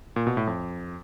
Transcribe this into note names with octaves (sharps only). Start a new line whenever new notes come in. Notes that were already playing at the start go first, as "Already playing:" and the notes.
A#2
B2
A2
F2